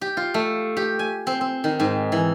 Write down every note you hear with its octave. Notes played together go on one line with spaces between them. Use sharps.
G4
F4
A3
G4
G#5
C4
C4
D#3
G#2
E3